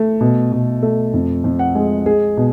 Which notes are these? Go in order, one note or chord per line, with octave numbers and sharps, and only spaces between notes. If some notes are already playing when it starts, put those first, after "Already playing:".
Already playing: A3
B2
B2
A3
F2
F2
F#5
G#3
G#3 G#4
B2